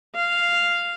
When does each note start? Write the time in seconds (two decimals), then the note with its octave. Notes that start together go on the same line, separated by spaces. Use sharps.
0.15 F5